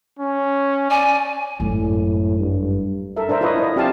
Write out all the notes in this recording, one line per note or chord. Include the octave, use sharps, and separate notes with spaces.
C#4
D5 G#5
G#1 F#2 A2
G2
A4 A#4 E5
D4 A#4 C5 E5
E4 F4 A#4 B4 C#5 D#5
D4 D#5
C4 F4 G4 E5 F5 A5